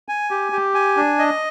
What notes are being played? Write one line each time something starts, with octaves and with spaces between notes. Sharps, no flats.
G#5
G4
G4
G#5
D4
D#5